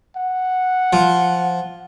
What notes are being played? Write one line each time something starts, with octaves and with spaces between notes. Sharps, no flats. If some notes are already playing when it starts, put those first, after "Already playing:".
F#5
F3